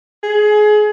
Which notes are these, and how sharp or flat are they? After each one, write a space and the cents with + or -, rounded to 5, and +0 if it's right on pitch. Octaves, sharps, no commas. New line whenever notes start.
G#4 +25